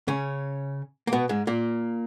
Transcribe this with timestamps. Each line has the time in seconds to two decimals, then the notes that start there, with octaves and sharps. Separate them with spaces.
0.08 C#3 C#4
1.07 A#3
1.13 B2 B3
1.29 G#2 G#3
1.47 A#2 A#3